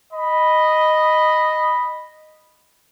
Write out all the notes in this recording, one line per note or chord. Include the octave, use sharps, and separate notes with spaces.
D#5 B5